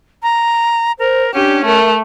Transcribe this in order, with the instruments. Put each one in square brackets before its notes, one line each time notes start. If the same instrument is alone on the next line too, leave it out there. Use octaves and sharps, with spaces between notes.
[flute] A#5
[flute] A#4 [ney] C5
[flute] C#4 [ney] D4 [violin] G4
[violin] A3 [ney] A#4